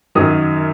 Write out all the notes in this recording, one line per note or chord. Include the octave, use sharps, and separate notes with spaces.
F#2 D#3 F#3 D#6